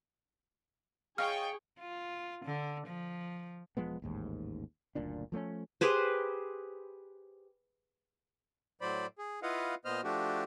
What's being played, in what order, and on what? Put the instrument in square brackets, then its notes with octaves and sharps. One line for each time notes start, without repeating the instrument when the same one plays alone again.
[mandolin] F4 D#5 [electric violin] G#4 [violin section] C#5 G5 C#6 [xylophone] F6
[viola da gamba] F4
D3
F3
[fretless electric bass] E1 F3 G#3 B3
A1 D#2 G#2
F#1 D2 A#2 D4
F3 A3 B3 C#4
[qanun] G4 G#4 B4 C5
[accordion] A2 F#3 C5 D5 B5
G#4
E4 F4 B4 D#5 F5 F#5
A#2 B3 C5 D#5 F6
F3 A3 D4 F#4 G4